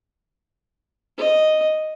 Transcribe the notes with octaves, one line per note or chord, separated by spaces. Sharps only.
D#5